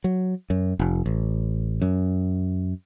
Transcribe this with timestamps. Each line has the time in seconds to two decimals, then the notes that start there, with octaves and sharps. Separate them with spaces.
0.04 F#3
0.50 F#2
0.79 F1
1.06 A1
1.81 F#2